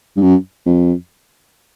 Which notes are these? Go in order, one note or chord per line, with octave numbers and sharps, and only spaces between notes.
G2
F#2
F2